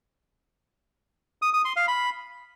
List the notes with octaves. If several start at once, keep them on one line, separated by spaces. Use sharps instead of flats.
D#6
D#6
C6
F5
B5